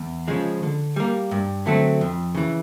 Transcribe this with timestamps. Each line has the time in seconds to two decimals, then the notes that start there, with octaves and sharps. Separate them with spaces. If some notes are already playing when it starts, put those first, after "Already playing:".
Already playing: E2
0.28 C#3 F3 G#3
0.63 D3
0.96 G3 A#3
1.31 G2
1.66 D3 F#3 A3 C4
2.01 F2
2.35 C#3 E3